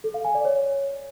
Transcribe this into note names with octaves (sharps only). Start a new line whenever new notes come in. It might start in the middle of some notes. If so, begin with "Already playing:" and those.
A4
F5
G#5
D5
C#5